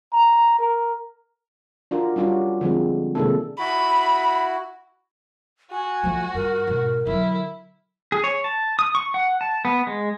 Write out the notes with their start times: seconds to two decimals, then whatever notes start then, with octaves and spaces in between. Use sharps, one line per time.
0.13 A#5
0.59 A#4
1.91 D4 F4 F#4 A#4
2.16 G3 C#4 D4 F4 F#4
2.61 D3 F3 G#3 C4
3.15 C3 D#3 G#3 A#3 D4 A4
3.59 E4 F#4 B5
5.71 F#4 G#5
6.03 F3 A3
6.34 G2 A#4
6.67 G#2 B2
7.07 D3 F#3 E4
8.12 G#4
8.24 C#5
8.44 A5
8.79 D#6
8.95 C#6
9.14 F#5
9.41 A5
9.65 B3
9.87 G#3